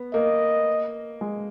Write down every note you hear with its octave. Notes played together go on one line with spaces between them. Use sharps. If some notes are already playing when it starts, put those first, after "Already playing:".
Already playing: B3
A#3 D#5
G#3